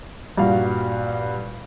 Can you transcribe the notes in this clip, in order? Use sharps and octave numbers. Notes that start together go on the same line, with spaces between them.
G2 A#2 F#4 F5